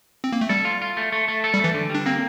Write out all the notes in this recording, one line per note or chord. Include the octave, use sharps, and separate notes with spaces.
C4
A#3
A3
G3 A4
F4
F4
A3
A3
A3
A4
G3
E3 A3
D3
G3 D4
A#3 C4